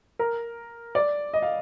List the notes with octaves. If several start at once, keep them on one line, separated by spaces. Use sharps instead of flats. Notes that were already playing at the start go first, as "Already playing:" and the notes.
A#4
D5
D#5
F5